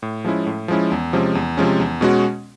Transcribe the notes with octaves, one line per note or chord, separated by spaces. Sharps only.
A2
F3 G#3 C#4 E4
A2
F3 G#3 C#4 E4
E2
C3 F3 G#3 C#4
E2
C3 F3 G#3 C#4
E2
B2 G#3 C#4 F#4